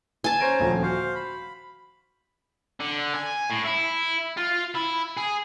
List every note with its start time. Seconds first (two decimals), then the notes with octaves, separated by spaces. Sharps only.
0.24 G#5 A5
0.40 C#4 C5 A#5 D7
0.59 D#1 D2 F3
0.83 F#4 C5 F5
1.15 B5
2.80 D3
3.14 G#5
3.50 A2
3.66 E4
4.37 F4
4.75 E4
5.17 G#4